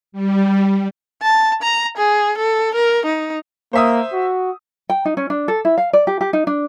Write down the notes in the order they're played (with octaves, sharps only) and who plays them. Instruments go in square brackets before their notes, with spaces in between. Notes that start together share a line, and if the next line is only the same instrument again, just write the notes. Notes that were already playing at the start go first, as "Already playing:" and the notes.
[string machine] G3
[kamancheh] A5
A#5
G#4
A4
A#4
D#4
[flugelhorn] A#3 [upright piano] C5 E5 D#6
[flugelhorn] F#4
[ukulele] G5
D#4
C#4
D4
A4
E4
F5
D5
G4
G4
D#4
D4